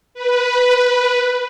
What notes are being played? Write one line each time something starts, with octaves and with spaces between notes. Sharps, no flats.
B4